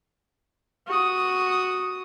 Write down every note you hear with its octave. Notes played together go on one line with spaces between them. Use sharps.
F#4 D#6